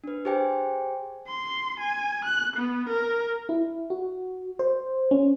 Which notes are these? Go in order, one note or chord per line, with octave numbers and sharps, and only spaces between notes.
D4 B4
G4 G#4 C5 G5 G#5
C6
G#5
F#6
B3
A#4
E4
F#4
C5
C#4